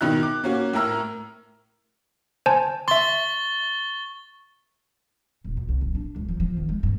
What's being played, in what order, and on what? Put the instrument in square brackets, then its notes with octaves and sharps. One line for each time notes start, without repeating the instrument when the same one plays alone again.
[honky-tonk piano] B2 D#3 D#4 E4 F#6
D6
A#3 C#4 F#4
A2 E4 A#4 A#5 E6 F6
[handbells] C5 G#5 A5
[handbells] E5 C6 [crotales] C#6 A6 G7
[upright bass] D#1
D2
C2
D1
D4
C#2
F3
F3
D#3
G#3
G2